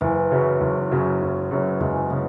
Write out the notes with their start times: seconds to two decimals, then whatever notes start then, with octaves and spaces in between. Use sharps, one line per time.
0.01 F#1 E3
0.31 F#2 C#3 F#3
0.61 F#1
0.91 F#2 C#3 F#3
1.21 F#1
1.51 F#2 C#3 F#3
1.80 F#1 G#3
2.10 C#3 B3